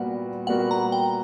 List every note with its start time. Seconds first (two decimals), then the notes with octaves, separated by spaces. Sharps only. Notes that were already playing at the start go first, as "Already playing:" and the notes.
Already playing: A#2 G3 B3 F#4 A#4 F#5
0.47 A#2 G3 B3 F#4 A#4 F#5
0.71 A#5
0.92 G5